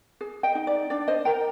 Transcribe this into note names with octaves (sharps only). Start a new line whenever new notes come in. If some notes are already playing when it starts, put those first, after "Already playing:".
G#4
D#5 G5
D#4
D5
D4 D5
C5 D#5
A#4 G5 A#5